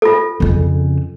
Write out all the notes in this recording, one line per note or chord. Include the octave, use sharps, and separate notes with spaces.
F4 A4
F2 C#3